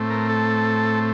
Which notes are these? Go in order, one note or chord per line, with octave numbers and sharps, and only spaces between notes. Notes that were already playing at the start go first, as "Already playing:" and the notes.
Already playing: A2 A3 C4
A#4
A4